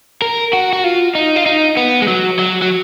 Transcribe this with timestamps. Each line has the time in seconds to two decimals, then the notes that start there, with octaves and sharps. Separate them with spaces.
0.22 A#4
0.53 F#4
0.73 F#4
0.84 F4
1.15 D#4
1.36 F4
1.46 D#4
1.77 B3
2.02 G#3
2.08 F#3
2.39 F#3
2.62 F#3